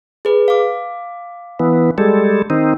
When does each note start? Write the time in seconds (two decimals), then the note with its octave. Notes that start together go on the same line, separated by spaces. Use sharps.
0.25 G#4 B4
0.48 F5 D6
1.60 E3 B3
1.98 G3 G#3 A4
2.50 D#3 C4 D#4